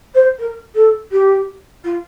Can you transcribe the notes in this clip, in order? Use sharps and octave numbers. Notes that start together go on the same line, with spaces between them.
C5
A#4
A4
G4
F4